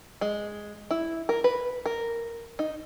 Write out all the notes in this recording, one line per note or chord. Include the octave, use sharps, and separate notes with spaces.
G#3
E4
A#4
B4
A#4
D#4